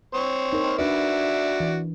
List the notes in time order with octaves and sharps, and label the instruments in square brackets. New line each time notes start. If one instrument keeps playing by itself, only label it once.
[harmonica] C4 C#5
[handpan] D#4 A#4
[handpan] D4 B4 [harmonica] F#4 D5 E5
[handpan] E3